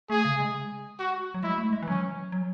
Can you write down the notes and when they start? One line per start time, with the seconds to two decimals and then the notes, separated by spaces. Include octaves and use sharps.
0.10 A3 G#4
0.25 C#3
0.40 G#3
0.99 F#4
1.34 F#3
1.43 G#3 E4
1.58 A3
1.73 G#3
1.83 E3
1.88 F#3 C#4
2.32 F#3